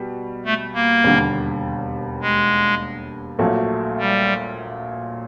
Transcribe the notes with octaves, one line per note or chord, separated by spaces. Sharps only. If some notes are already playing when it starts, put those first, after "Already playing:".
Already playing: B2 G3
A3
A#3
E1 D#2 D3 G3
G#3
A#1 A#2 F#3 A3
G3